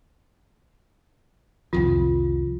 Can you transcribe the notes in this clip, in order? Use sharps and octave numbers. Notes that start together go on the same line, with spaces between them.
C2 F2 D#3 F4